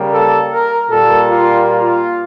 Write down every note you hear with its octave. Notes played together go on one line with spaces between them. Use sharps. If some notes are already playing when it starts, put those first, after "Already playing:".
Already playing: C#3 G3 A#3
A4
A#4
A#2 G3 A#3 A4
F4
F4